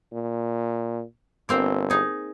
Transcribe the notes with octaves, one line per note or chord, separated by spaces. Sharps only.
A#2
G1 A#3 C4 C5
D#4 G#4